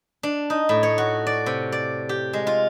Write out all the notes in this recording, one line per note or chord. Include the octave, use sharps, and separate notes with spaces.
D4
D#4
A2
C#5
F#4
D5
C3
D5
G4
G#3
F4